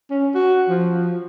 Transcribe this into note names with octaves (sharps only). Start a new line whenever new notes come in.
C#4
F#4
F3